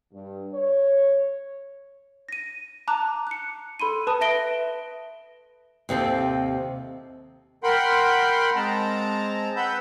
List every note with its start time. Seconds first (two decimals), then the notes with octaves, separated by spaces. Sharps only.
0.13 G2
0.54 C#5
2.29 A#6 D#7
2.88 A5 A#5 D6 F#6
3.27 F#6 C#7
3.80 A4 B5 C6 D#7
4.07 B4 A5 D#6
4.21 B4 E5 A#6 D7 G7
5.89 D#2 C3 C4 A4
7.63 A#4 F#5 G5 B5 C6
8.56 G#3 C4 A5 A#5
9.56 B4 F#5 B5 E6 G6